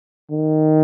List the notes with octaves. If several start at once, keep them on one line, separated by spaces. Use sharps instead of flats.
D#3